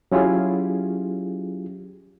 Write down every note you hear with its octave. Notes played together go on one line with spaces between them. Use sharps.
F#3 C#4 E4 F4 G4 G#4